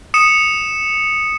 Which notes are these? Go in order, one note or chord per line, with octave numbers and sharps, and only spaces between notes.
D#6 C#7 E7